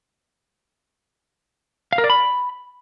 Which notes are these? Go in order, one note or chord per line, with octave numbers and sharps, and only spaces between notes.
F5
A#4
D5
B5